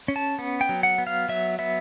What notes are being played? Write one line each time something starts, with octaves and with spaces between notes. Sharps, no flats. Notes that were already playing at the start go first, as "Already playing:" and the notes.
C#4
A5
B3
G5
F#3
F#5
B3
F5
F#3 E5
B3 E5